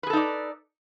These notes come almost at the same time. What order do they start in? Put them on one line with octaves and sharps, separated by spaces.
B4 G#4 A4 D#4 D5